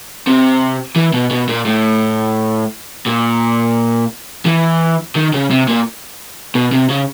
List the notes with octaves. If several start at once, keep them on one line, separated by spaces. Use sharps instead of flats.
C3
E3
B2
B2
A#2
A2
A#2
E3
D#3
C#3
C3
A#2
B2
C3
C#3